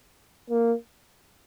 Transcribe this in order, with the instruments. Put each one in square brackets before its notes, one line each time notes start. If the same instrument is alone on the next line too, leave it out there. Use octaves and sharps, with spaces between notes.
[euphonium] A#3